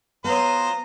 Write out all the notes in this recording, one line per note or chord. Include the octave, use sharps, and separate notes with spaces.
F#3 B3 F4 C5 A#5 D#6